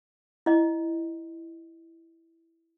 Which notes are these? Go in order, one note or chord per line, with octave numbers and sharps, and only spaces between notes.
E4 D#5